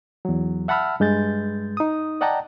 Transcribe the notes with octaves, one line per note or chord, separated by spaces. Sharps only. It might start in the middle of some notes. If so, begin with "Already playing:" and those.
E2 F#3
E5 F#5 A5 B5 E6 F6
G2 G#3 G6 A6
D#4 D#6
D5 D#5 F#5 G5 A5 A#5